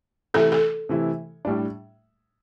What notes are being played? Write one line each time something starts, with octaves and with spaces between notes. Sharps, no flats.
C3 E3 A3 E4 A4
A4
C3 E3 A3 E4
A2 G3 D4